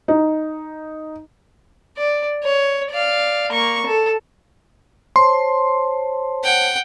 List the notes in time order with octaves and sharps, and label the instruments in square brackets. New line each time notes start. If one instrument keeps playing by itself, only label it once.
[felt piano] D#4
[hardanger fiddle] D5
C#5
D5 F5
A#3 C#6
A4
[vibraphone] C5 C#5 A5 [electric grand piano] C6
[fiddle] F#5 G5